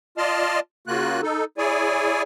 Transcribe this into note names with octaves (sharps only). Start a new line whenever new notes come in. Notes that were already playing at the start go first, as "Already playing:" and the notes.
F4 D5 D#5 A5 C6 F6
C#3 A#3 F4 F#4 F#6
D#4 A4
E4 G#4 C#5 D5 G#5